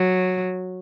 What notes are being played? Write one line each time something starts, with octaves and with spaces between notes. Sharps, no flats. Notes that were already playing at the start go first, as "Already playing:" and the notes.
Already playing: F#3